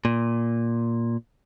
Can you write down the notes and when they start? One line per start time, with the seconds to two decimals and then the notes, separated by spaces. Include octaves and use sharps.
0.05 A#2